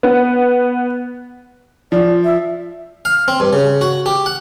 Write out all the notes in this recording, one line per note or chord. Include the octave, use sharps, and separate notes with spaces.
B3
F3 D5
E5
F5
C4
G2
C#3
F#4
G4
F#5